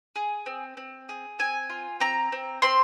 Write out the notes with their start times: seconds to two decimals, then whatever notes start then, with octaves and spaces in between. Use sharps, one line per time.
0.16 G#4
0.46 C4
0.77 C4
1.09 G#4
1.39 C4 G#5
1.70 F4
2.00 C4 A#5
2.32 C4
2.62 C4 C6